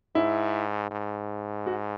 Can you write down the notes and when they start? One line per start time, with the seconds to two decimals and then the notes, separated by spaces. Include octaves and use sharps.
0.15 G#2 E4
0.91 G#2
1.67 F#4